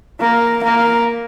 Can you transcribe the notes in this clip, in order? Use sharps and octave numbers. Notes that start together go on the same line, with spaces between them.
A#3
A#3